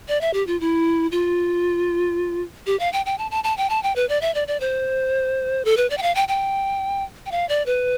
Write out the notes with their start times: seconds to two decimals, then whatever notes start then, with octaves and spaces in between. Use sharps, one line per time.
0.08 D5
0.21 E5
0.34 G4
0.47 F4
0.60 E4
1.12 F4
2.67 G4
2.80 F5
2.93 G5
3.06 G5
3.18 A5
3.31 A5
3.44 A5
3.57 G5
3.70 A5
3.83 G5
3.96 B4
4.09 D5
4.22 E5
4.35 D5
4.48 D5
4.60 C5
5.65 A4
5.77 B4
5.90 D5
5.98 G5
6.02 F5
6.15 G5
6.28 G5
7.26 G5
7.32 F5
7.49 D5
7.66 B4